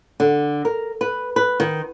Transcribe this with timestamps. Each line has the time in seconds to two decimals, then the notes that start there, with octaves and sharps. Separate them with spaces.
0.20 D3
0.65 A#4
1.01 B4
1.36 B4
1.60 D#3